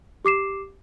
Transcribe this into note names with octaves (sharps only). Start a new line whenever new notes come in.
G4 D6 C7 E7